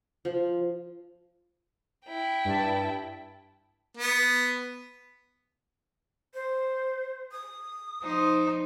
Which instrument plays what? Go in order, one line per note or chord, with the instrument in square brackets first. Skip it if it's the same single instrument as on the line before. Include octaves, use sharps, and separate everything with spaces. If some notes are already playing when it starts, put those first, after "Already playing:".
[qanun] F3
[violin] E4 G5
[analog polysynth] G2 A5
[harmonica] B3
[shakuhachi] C5
D#6
[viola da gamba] F3 D#4 C5